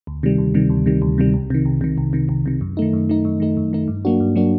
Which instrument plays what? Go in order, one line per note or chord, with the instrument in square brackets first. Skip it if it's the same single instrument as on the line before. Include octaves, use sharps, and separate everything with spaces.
[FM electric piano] D2
C3 D#3 G3
D2
C3 D#3 G3
D2
C3 D#3 G3
D2
C3 D#3 G3
C2
C3 D#3
C2
C3 D#3
C2
C3 D#3
C2
C3 D#3
F#2
D#3 A3 D#4
F#2
D#3 A3 D#4
F#2
D#3 A3 D#4
F#2
D#3 A3 D#4
G2
F#3 A#3 D4 F#4
G2
F#3 A#3 D4 F#4